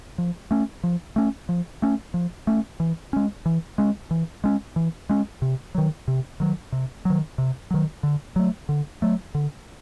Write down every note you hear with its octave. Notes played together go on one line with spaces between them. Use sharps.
F3
A3 C#4
F3
A3 C#4
F3
A3 C#4
F3
A3 C#4
E3
G#3 C#4
E3
G#3 C#4
E3
G#3 C#4
E3
G#3 C#4
C3
D#3 F#3
C3
D#3 F#3
C3
D#3 F#3
C3
D#3 F#3
D3
F#3 A3
D3
F#3 A3
D3